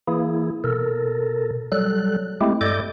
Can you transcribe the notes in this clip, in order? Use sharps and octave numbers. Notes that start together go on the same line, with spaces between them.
E3 A#3 E4 G#4
B2 A4 A#4
F#3 G3 A4 F#6
G#3 A3 C4 E4 G4
G2 A4 D5 D#5 D6 G6